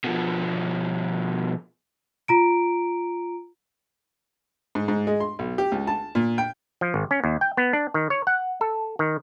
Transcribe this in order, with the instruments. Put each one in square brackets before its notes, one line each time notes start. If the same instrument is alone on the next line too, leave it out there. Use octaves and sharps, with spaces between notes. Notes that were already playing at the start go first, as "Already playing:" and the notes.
[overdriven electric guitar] B2 F3
[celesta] F4 A#5 D7
[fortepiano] G#2
G#2
G#3
C6
B1
G4
C#2
A5
A#2
G5
[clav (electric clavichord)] F3
G#1
C#4
D#2
G5
B3
D4
D#3
C#5
F#5
A4
D#3